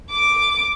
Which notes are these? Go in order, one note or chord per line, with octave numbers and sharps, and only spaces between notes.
D6